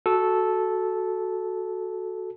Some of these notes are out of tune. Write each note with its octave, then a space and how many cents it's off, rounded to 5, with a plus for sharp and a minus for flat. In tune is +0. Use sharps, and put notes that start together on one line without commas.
F#4 +0 A4 -10